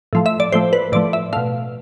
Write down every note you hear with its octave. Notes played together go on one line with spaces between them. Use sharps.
A2 F3 A3
E5
D5
A2 F3 A3 C5
B4
A2 F3 A3 D5
E5
B2 A3 F5